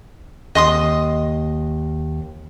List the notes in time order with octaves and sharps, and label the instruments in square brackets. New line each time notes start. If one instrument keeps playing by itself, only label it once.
[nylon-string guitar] D#2 [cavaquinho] D#5 C6 D#6